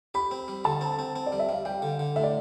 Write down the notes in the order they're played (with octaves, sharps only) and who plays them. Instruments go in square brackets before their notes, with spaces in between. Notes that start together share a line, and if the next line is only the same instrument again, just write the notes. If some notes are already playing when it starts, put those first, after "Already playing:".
[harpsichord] G4 [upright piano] B5
[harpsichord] C4
G3
[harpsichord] D3 [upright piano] A5
[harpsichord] C4
C4
C4
[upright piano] D5
[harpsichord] G3
[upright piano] E5
[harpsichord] G3 [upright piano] F5
[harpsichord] G3 [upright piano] G5
[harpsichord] D3
D3
[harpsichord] A2 [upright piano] E5
[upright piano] D5